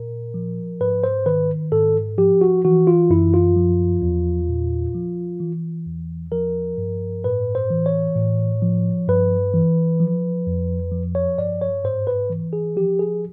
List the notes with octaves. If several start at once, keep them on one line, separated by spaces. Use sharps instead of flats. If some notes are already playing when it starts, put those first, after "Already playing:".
Already playing: A#2 A#4
F3
G#2 B4
C5
D#3 B4
G#2 A4
F3 G4
F#4
E3 F#4
F4
F#2 E4
F4
F3
E2
A#2
F3
E3
E2
F3 A#4
G2
A2 B4
C5
E3
C#5
A2
F3
G2 B4
E3
F3
F2
F3
C#5
G2 D5
C#5
G#2 C5
B4
E3
G#4
F3 G4
G#4